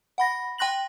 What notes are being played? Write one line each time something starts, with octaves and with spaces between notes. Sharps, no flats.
F#5 B5 A#6
G5 C6 F#6 A#6 F#7